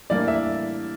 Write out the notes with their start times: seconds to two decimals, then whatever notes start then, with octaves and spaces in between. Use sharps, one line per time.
0.10 A2 E3 G3 A#3 D4 D5
0.28 E5